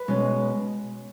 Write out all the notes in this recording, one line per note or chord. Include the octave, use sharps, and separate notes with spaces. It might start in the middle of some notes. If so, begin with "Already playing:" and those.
Already playing: B4
B2 G#3 C#4